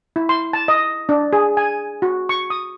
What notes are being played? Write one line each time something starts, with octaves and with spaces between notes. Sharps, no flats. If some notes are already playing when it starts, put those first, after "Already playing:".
E4
C6
A5
D#5
D4
G#4
G#5
F#4
C#6
D#6